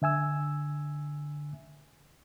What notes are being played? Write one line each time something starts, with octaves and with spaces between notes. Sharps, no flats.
D3 E5 G#5 E6